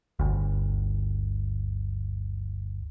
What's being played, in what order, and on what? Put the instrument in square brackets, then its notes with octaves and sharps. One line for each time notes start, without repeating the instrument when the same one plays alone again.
[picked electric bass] G1 D2